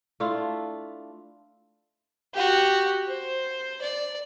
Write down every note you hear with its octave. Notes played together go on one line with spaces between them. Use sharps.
A3 D4 E4 F4
F#4 G4
C5
D5